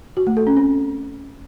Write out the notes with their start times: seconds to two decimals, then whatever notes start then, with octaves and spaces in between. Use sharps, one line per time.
0.17 F#4
0.27 A3
0.37 A4
0.47 C#4
0.57 C4